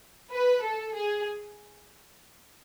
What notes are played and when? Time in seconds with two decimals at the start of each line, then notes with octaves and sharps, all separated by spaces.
0.32 B4
0.63 A4
0.95 G#4